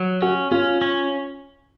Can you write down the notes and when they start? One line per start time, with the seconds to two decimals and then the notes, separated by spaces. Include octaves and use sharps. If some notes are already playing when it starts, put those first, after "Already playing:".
Already playing: F#3
0.22 C#4 F#4
0.51 C#4 F4
0.81 C#4